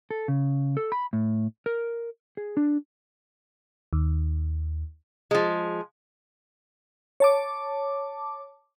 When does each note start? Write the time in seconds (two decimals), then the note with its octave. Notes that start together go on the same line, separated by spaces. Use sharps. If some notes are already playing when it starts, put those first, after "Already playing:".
0.11 A4
0.28 C#3
0.77 A4
0.92 B5
1.13 A2
1.66 A#4
2.37 G#4
2.57 D4
3.93 D#2
5.31 F3 G#3
7.20 C#5 A5 D6